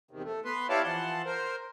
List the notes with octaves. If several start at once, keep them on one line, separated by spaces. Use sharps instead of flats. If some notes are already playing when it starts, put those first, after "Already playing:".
E2 C3 D#3
A3
B3 B4 C6
E4 G4 C#5 D5 F5 A5
E3 F3 F#5 A5 C6
A#4 C5